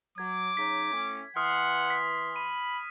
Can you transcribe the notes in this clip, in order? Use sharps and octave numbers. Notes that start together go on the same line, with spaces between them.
F#3 D6 G#6
C#3 F#3 D#4 B6
A2 A3 C#4
E3 F#5 C6 D#6 F6
B6
B5 D#7